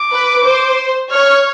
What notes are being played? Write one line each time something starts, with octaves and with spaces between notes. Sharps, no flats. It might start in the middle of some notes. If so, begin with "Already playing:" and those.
Already playing: D6
B4
C5
C#5 F6